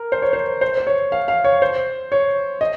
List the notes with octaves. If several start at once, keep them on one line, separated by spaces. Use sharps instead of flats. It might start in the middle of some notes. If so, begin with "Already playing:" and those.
Already playing: A#4
C5
C#5
C5
C5
C5
C#5
F5
F5
C#5
C5
C#5
D#5